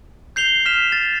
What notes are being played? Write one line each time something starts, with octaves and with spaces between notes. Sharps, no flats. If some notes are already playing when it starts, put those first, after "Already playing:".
G6 C7 F7 G7
F6 B6 E7
A6